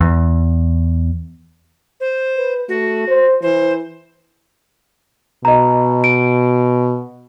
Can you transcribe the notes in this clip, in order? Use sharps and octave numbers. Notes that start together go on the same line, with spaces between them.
E2
C5
B4
A3 F#4
C5
E3 C5
B2 D#5 A#5
D7